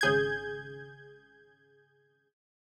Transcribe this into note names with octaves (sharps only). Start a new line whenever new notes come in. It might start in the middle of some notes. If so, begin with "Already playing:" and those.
G#1 C#3 G#4 G6 G#6